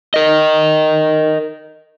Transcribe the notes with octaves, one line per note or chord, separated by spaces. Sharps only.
A#4 D#5